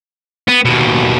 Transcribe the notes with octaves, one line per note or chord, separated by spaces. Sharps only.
B3
D#2 B2